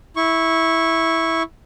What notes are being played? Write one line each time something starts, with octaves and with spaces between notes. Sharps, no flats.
E4 C#6